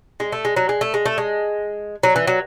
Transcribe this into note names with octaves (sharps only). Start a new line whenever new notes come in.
G#3
A3
G#3
F#3
G#3
A3
G#3
A3
G#3
F#3
E3
F#3